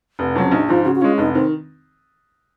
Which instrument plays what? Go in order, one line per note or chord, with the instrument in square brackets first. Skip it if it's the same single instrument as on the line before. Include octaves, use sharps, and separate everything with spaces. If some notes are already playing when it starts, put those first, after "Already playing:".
[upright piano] F1
[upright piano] F2 C#3 F#3 [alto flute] C#4
[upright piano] A#1 [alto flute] D#4
[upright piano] G#2 F3 [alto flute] F4
[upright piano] C#3 [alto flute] F#4
[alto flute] F#4
[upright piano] G#3 C#4 [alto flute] F4
[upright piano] F1 [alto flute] D#4
[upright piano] D#3 [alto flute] C4